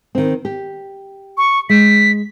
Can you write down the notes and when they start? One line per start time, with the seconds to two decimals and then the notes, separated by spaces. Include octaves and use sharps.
0.15 D#3 C4
0.45 G4
1.37 C#6
1.69 G#3 B6